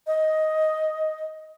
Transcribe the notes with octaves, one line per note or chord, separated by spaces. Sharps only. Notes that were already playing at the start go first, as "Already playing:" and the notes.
D#5